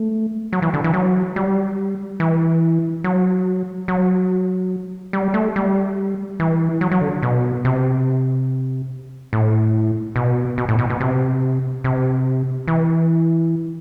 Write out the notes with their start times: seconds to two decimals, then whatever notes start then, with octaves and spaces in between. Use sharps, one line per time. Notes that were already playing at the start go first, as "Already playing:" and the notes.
Already playing: A3
0.53 F#3
0.62 E3
0.73 D3
0.84 E3
0.94 F#3
1.36 G3
2.20 E3
3.04 F#3
3.88 F#3
5.13 G3
5.34 A3
5.56 G3
6.40 E3
6.81 F#3
6.92 F#3
7.01 D3
7.22 B2
7.65 C3
9.33 A2
10.16 B2
10.58 B2
10.69 A2
10.79 B2
10.90 B2
11.00 C3
11.84 C3
12.68 E3